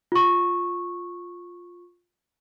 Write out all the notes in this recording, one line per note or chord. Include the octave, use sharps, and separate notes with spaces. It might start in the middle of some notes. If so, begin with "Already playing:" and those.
F4 C#6